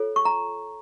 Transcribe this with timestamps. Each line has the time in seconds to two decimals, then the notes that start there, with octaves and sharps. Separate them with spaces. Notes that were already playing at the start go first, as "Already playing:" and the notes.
Already playing: F4 A4 C#5
0.16 C#6
0.25 A#5